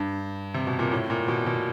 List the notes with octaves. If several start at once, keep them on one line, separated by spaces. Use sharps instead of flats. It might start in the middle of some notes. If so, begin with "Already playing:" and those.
Already playing: G2
C3
B2
A#2
A2
A#2
B2
B2